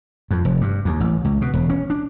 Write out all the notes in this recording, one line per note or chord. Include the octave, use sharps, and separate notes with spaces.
F2
F1
G2
D#2
A1
C#2
B2
E1
C#4
D4